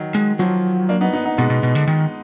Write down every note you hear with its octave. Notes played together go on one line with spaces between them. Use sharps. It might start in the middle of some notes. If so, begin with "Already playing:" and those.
Already playing: D#3 F#3
G#3
F3 F#3
A#3 D4
B3 D#4
B3 D#4
B3 D#4
B2 G#3 B3
B2
B2
D3
D#3